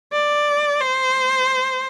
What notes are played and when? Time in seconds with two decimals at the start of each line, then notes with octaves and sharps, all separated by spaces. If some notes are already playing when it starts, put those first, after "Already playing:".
0.13 D5
0.81 C5